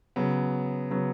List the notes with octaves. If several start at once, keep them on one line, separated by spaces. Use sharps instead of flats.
C#3 F#3 B3
C#3 F#3 B3